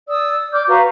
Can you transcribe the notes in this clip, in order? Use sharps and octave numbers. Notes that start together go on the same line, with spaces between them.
D5 D#6 E6
D5 D6 F6 G6
F#4 B4 F5 A#5